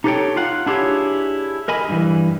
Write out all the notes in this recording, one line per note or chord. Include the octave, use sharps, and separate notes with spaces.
D#4 G4 A4 B4 C#5 G5
F4 F5 F#5
D4 E4 G4 G#4 C#5
A#4 D#5 G#5 B5
G2 E3